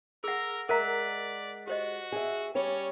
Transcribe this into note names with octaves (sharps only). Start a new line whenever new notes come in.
G#4 A#4 F#5 E6 A#6
G#3 A#4 D5 E5 F#5 A#5 F#6 B6
F#4 G4 C5 D#5
G#4 E5
G3 C#4 C#5 D5